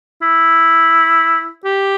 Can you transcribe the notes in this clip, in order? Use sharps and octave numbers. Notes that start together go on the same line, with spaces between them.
E4
G4